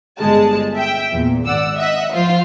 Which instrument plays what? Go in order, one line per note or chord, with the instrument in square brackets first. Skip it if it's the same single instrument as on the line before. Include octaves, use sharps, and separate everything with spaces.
[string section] G1 G#3 A5
E5 G5
E2 A#2
G#1 D5 F#5 E6
D#5 E5 F#5
F3 F4 C5